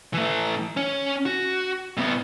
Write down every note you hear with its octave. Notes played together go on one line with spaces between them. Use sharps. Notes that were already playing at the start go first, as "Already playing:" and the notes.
E3 A3
C#4
F#4
A2 B3